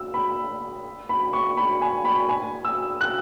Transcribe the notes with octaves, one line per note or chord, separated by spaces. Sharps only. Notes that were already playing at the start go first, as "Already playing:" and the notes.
Already playing: E6
B5
B5
C#6
B5
G#5
B5
G#5
E6
F#6